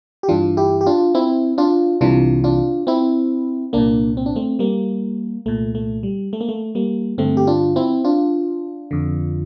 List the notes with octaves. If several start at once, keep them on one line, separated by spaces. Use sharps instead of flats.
G4
G2 E3 D4 F4
E4 G4
G4
D4 F4
C4 E4
D4 F4
C2 C3 E3 D4 F4
D4 F4
C4 E4
C2 A#2 A#3 D4
C4
D4
A3 C4
G3 A#3
C2 A#2 A3
A3
G3
A3
A#3
A3
G3 A#3
G2 D3 A3 C4
G4
D4 F4
C4 E4
D4 F4
F2 D3